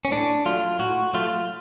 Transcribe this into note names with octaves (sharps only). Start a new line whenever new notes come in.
C#4
A2 D4
F#3 A3 F4
A2 F#4
F#3 A3 F4